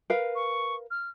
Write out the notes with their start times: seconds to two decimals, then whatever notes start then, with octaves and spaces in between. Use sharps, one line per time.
0.10 A#4 B4 F5
0.35 C#6
0.91 F6